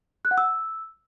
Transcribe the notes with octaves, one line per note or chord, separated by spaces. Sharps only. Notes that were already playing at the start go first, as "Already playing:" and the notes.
F#6
F#5
E6